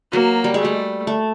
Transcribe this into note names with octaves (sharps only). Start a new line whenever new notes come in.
F#3 A#3
G3
G#3
A3
G3
A3